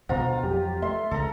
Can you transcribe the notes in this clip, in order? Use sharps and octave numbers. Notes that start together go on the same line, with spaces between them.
D2 B2 F4 C5 F#5 A#5
F2 F#3 G4
A3 E5 C6
C#2 A4 A#5